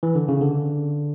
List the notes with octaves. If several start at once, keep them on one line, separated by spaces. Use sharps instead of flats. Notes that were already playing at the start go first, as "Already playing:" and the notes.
E3
D3
C#3
D3